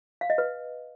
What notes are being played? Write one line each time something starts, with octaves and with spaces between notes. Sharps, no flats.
F5
D#5
B4